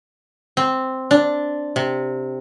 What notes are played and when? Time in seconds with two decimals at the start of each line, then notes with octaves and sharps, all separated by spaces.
0.57 C4
1.11 D4
1.76 C3